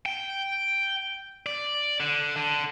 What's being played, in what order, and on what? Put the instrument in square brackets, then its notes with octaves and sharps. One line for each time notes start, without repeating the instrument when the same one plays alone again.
[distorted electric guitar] G5
D5
D3
D3